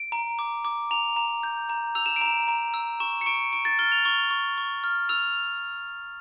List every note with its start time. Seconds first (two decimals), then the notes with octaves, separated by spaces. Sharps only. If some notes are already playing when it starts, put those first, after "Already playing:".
Already playing: D7
0.12 A#5
0.39 D6
0.65 D6
0.91 A#5 F7
1.17 A#5
1.43 G6
1.69 A#5
1.95 E6 F7
2.06 E7
2.16 D7
2.21 A#5 E7
2.48 A#5
2.74 E6
3.00 C#6 E7
3.21 C#7
3.26 C#6 D7
3.53 C#6 D7
3.65 A6
3.79 F6 G7
3.92 F7
4.05 C#6 G7
4.31 C#6
4.58 C#6
4.84 F6
5.09 E6 F7